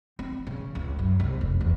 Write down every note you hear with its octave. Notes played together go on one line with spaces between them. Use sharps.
C4
C#3
C#2
F#2
C2
F1
E2